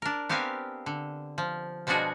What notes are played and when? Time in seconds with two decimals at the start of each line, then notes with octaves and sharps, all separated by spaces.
0.02 D4 A#4
0.29 B3 C4 G4 A#4 F5 G#5
0.86 D3
1.38 F3
1.87 B2 F3 G#3 D4 F#4 G#4